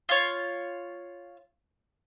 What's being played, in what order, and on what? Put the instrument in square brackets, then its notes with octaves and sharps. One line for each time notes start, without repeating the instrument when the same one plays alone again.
[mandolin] F4 C#5